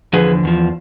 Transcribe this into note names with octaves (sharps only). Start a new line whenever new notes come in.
E2 D3 F3 G#4 B4
E2 D3 F3